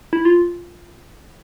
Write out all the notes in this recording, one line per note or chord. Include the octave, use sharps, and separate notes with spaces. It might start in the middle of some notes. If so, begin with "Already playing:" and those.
E4
F4